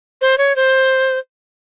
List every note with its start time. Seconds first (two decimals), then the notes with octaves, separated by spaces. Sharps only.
0.21 C5
0.38 C#5
0.56 C5